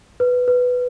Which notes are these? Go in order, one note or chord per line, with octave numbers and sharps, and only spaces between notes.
B4
B4